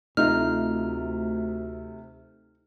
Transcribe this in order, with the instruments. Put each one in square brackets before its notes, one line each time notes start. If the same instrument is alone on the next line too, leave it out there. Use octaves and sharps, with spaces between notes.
[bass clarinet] D2 [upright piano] C3 A3 A4 [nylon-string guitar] D#4 F4 [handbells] F6